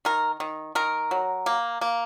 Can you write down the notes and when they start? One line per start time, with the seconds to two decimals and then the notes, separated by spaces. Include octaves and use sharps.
0.05 D#3 A#4
0.40 D#3
0.75 D#3 A#4
1.11 F#3
1.46 A#3
1.81 A#3